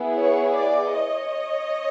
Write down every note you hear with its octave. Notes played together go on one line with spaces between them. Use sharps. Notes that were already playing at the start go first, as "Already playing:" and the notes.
Already playing: B3 E4 G#4
C#5
D5
C#5 D#5